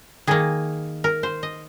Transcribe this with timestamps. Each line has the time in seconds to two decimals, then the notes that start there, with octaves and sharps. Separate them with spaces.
0.27 D#3 A#3 G#4
1.04 A#4
1.23 C5
1.43 D#5